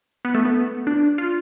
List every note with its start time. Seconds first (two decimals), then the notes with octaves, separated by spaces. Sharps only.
0.25 B3
0.35 A3
0.45 B3
0.87 D4
1.18 F4